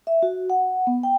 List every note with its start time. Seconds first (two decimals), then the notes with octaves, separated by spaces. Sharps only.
0.07 E5
0.23 F#4
0.50 F#5
0.87 B3
1.03 G5